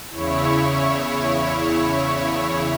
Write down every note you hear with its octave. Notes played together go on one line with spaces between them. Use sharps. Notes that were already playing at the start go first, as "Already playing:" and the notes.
E2 C#3 E4 C#5